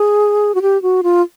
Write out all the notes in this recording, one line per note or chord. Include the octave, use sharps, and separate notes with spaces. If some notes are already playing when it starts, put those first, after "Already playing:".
Already playing: G#4
F#4
G4
F#4
F4